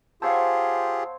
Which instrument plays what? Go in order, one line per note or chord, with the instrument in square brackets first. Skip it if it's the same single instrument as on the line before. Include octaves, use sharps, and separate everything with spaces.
[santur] C4 C#5 [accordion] F4 G4 G#4 [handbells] F5 F#5 A5